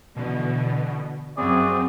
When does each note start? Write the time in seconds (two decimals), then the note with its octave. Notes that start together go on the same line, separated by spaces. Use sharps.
0.16 B2 D3 E3
1.38 F#2 C4 E4 F#4 G#4 D5